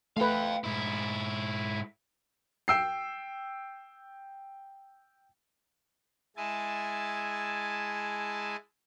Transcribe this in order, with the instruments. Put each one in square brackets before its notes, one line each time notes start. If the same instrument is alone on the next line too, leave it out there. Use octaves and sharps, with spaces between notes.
[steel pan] A3 B4 [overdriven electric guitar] F5 G5
[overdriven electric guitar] G#2 E4
[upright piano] G5 E6 C7
[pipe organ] G#3 E4 G#5 A5